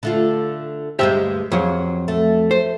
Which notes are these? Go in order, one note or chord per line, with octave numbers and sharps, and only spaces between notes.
D3 A3 F4
D2 G2 G#3 G4 C5 E5
F2 F#3 G#4
A3
C5